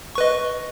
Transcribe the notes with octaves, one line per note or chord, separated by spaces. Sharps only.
B4 D#5 C#6